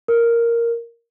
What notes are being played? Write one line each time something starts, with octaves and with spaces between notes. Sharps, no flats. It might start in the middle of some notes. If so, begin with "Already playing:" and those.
A#4